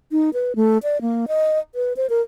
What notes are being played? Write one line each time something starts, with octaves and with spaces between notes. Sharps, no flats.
D#4
B4
A3
D5
A#3
D#5
B4
C5
A#4